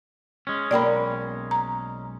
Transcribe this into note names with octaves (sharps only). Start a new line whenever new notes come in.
G#3 C#4
B1 A#3 A#4 D5 G5 B5
A#5